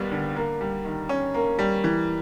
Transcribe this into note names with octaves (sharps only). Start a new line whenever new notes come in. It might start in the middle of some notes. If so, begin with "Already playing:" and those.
Already playing: D#2 G3 B3
D3
A#3
G3
D#3
C#4
A#3
G3
E3